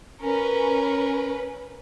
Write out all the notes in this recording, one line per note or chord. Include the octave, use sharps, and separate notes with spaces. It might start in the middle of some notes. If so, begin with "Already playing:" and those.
C#4 A#4 B4